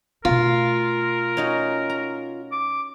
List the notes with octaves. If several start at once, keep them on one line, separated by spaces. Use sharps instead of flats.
B2 A3 F4 A#4
C#4 D#4 F#4
A#5
D6